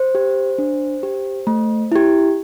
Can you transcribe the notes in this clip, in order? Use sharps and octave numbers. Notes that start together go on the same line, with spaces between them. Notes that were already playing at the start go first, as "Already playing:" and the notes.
Already playing: C5
G4
D4
G4
A3
E4 G4